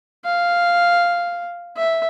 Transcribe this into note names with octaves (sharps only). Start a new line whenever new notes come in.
F5
E5